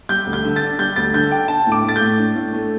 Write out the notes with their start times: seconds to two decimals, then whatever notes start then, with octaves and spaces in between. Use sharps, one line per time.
0.09 G3 G6
0.26 D2
0.33 G6
0.45 D3
0.56 A6
0.62 D4
0.79 G3 G6
0.96 D2 A6
1.14 D3 G6
1.32 D4 G5
1.48 D4 A5
1.67 A2
1.72 D6
1.83 A3
1.89 A6
1.96 G6
2.01 A2
2.19 D4
2.36 A2
2.53 A3